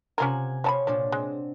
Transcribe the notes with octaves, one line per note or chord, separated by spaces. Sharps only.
C3 C#4 F4 A#4 F#5 G#5
F3 C#5 A5 B5
A#2 F3 D4
G#3 C4